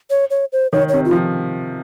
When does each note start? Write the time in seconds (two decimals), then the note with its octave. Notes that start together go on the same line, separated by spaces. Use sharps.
0.10 C#5
0.30 C#5
0.52 C5
0.72 D#3 C#5
0.89 C3 C#5
1.05 F4
1.11 F3